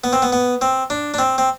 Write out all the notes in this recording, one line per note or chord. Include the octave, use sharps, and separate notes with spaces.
B3
C4
B3
B3
C4
D4
D4
C4
C4